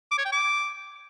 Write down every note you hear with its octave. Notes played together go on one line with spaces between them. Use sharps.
D6
C#5
G5
D6